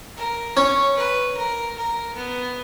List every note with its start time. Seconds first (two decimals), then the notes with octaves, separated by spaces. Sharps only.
0.17 A#4
0.57 C#4 C#5
0.97 B4
1.37 A#4
1.77 A#4
2.16 B3